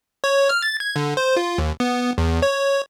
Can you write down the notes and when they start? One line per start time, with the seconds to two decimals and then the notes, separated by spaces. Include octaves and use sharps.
0.24 C#5
0.49 F6
0.62 A6
0.80 G#6
0.96 D3
1.17 C5
1.37 F4
1.58 D#2
1.80 B3
2.18 E2
2.42 C#5